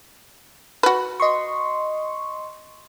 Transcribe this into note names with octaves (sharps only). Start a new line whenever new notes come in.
F#4 B4
D#5 C6 C#6